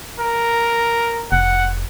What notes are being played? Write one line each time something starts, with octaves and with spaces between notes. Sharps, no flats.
A#4
F1 F#5